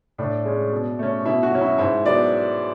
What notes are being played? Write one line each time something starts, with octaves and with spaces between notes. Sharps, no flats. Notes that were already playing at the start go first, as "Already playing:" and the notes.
A2 D4
G#3 C#4
B2
A3 C#4
B2 E4
F#4
F#3 C#4
E4
G#2 E4
F#3 B3 D5